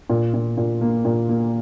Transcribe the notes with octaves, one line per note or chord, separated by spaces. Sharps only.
A#2
A#2
A#2
A#3
A#2
A#3